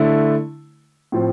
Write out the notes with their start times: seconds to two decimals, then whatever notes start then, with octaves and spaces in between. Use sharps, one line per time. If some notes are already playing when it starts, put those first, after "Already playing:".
Already playing: D3 A3 E4
1.12 A2 F3 C4